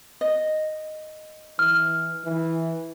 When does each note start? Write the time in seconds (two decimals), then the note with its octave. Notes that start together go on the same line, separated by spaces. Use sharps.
0.21 D#5
1.59 E3 F6
2.25 E3